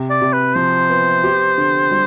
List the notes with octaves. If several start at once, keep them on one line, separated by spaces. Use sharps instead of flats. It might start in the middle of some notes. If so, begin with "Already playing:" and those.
Already playing: C3
D5
C3
B4
F3 C5
B3
G4
D3
G3